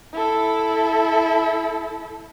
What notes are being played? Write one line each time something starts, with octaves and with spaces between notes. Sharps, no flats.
E4 A4